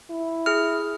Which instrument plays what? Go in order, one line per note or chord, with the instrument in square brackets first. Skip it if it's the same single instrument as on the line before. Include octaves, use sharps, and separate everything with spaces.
[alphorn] E4
[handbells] G#4 F6